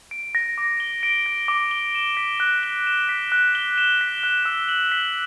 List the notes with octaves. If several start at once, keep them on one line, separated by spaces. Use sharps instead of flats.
D7
A#6
D6
G7
D7
A#6
D6
G7
E7
B6
F#6
G7
E7
B6
F#6
G7
E7
B6
F#6
E6
F#7
B6